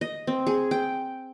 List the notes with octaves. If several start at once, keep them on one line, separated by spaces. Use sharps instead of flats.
D#5
C4
G#4
G5